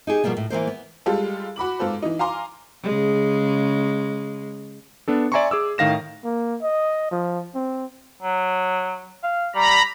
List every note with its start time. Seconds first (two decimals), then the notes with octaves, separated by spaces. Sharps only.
0.07 D#4 G4 G#4
0.24 B2 F3 G3 A#3 B3
0.37 A2
0.50 E3 F#3 A#3 C5
0.67 B3
1.06 G3 G#3 F4 G4 A4
1.56 F#4 B5 D6 F#7
1.79 G#2 F4 A4 C5
2.02 E3 D#4
2.19 F5 G#5 A#5 C6 D6
2.83 C#3 G#3
5.08 B3 D4 A4
5.32 D5 E5 G#5 A#5 C6 C#6
5.51 G#4 D6 E6
5.78 A2 D#3 F5 A#6 E7
6.25 A#3
6.62 D#5
7.11 F3
7.55 C4
8.22 F#3
9.23 F5
9.55 G3 A#5 B5